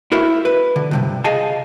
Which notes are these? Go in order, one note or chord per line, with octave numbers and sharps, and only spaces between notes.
E4 F#4 A#4 C5 E5
B4
D3
E2 G2 C3
G#4 D#5 F5 G#5 A5